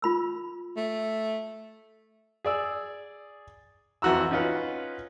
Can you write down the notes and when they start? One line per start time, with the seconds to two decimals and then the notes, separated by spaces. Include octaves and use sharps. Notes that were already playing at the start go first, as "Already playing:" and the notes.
0.02 F4 B5 E6
0.77 A3
2.45 G#4 D5 E6
4.02 F2 E3 F#4 A#5 E6
4.31 C#4 D#4 F4 B4 F#5